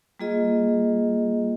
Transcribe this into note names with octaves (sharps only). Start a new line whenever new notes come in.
G3 A#3 F4 G#4 D#5